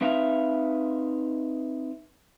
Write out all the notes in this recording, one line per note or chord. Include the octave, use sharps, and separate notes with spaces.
C4 D#4 B4 E5 F5